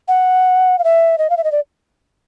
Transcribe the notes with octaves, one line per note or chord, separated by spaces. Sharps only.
F#5
F5
E5
D#5
F5
E5
D#5
D5